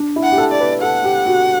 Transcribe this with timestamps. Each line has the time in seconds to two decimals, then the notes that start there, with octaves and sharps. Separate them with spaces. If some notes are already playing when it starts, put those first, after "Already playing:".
Already playing: D4
0.16 E4
0.23 F#5
0.32 G4
0.38 A4
0.52 D5
0.60 B4
0.81 A4 F#5
1.04 G4
1.26 F#4